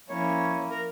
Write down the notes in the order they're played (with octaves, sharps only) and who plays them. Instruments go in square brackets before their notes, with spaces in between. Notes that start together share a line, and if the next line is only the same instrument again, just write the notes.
[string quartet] F3 A#3 C#4 E4 [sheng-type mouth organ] C#5
[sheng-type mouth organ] A#4